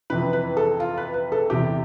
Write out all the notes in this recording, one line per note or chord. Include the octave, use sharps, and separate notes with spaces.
F2 C3 E3 B4
B4
A4
F4
B4
B4
A4
E2 C3 E3 G4